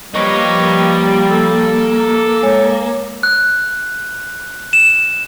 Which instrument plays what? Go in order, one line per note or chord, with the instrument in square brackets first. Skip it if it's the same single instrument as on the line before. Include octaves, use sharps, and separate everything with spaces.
[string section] F3 G3 [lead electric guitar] A#3 [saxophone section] B4 C#5 D#5
[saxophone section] A4
[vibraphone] G#3 C#5
[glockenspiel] F#6
E7